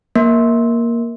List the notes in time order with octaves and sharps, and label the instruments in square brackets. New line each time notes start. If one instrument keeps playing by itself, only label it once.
[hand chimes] A#3